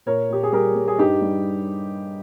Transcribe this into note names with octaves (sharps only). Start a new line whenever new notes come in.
A#2 A#4 C#5
A#2 G4
G#4
G3 G4 A#4
G3
G#4
G2 D#4 G4
G3